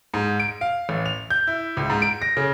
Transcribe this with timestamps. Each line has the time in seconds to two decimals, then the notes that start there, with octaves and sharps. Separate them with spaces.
0.14 G#2
0.40 D7
0.61 F5
0.89 A1
1.06 F7
1.30 G6
1.47 E4
1.77 C#2
1.90 G#2
2.02 D7
2.22 A#6
2.37 C#3